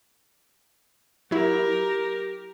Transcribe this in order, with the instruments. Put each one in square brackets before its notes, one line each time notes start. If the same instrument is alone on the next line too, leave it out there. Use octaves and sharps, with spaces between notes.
[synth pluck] F#3 E4 [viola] G4 A#4